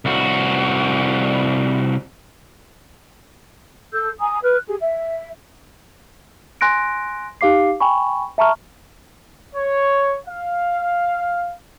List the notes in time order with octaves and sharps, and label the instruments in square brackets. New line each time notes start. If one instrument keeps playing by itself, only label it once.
[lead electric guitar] C2 F#4
[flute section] A4 E6 G6
G#5 A#5 D#6
B4 F6 F#6
G4 G#4
E5
[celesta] G#5 C6 F#6 A#6 D7
D#4 G4 F5 D6 C7
G5 G#5 B5 C#6
E5 A5 A#5 C#6 F6
[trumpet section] C#5
F5